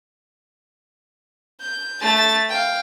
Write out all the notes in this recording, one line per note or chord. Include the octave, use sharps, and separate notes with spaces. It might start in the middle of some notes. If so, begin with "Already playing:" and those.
G6
A3 A6
F5 G5